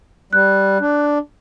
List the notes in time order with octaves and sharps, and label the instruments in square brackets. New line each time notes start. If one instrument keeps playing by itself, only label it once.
[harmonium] G3 [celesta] F#6
[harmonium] D4